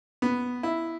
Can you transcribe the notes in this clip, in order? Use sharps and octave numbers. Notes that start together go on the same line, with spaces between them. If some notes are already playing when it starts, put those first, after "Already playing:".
B3
E4